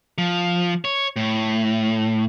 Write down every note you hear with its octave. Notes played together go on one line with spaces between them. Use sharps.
F3
C#5
A2